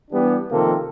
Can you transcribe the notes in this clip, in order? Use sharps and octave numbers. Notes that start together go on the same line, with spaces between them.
E3 G3 B3 D4 G4
C3 D#3 F3 A#3 F4 A4